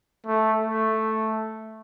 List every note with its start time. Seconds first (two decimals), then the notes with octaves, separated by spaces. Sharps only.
0.27 A3
0.62 A3